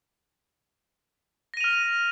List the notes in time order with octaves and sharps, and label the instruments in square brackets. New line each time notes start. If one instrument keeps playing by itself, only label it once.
[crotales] A#6
D#7
F7
F6